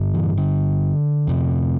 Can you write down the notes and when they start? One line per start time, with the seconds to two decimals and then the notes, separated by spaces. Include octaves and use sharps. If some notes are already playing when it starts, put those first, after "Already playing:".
Already playing: G2 D3
0.14 E3
0.37 D3
1.27 F2 C3